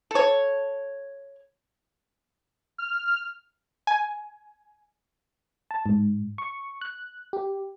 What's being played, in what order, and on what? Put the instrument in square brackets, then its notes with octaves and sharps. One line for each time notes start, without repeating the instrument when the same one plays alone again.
[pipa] A4 C#5
[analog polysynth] F6
[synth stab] G#5
[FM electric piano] A5
G#2
C#6
F#6
G4